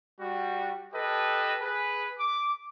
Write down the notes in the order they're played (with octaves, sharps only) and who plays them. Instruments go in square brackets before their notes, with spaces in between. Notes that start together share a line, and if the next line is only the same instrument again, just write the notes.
[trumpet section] G3 F#4
G4 A4 B4 D#5
G#4 B4
D6